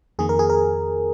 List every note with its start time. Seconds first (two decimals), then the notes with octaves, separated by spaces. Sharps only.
0.19 F2 D#3 A#3 G#4
0.29 A#4
0.39 G#4
0.50 A#4